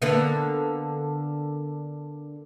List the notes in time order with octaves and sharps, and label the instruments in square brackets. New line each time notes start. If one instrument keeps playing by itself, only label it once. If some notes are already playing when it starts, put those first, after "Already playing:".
[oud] D3 A#3 B3